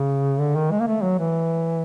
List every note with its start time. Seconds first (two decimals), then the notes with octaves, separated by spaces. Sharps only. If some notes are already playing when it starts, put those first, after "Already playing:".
Already playing: C#3
0.39 D3
0.56 D#3
0.71 G#3
0.80 A#3
0.87 A3
1.03 F#3
1.19 E3